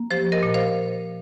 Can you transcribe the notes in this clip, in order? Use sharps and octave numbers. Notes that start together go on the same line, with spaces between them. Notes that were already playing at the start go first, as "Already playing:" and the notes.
Already playing: A#3
F3 G4 C5
A#4 D#5
A#2
C5 F5